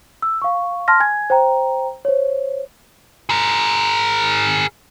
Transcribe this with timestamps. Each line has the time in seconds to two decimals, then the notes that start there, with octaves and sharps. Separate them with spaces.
0.22 E6
0.42 F5 C#6
0.88 A5 C6 F6 A#6
1.00 G#5 G#6
1.30 C5 G5 A#5
2.05 C5 C#5
3.29 G#4 A#4